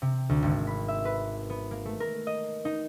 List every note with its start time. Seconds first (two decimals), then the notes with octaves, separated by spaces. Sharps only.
0.02 C3
0.29 D2
0.43 G#1
0.67 B5
0.88 E5
1.05 B4
1.50 B3
1.71 A#3
1.86 A3
2.00 A#4
2.27 D#5
2.65 D#4